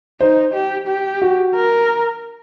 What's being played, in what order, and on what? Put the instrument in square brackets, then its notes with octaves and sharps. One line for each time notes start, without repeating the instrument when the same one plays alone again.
[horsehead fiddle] D#4 [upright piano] C5
[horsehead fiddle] G4
G4
[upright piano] F#4
[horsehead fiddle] A#4